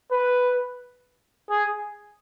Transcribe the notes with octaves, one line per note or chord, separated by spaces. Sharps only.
B4
G#4